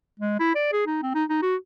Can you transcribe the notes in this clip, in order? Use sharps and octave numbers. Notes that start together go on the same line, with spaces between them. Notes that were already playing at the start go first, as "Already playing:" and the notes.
G#3
E4
D5
G#4
D#4
C4
D#4
D#4
F#4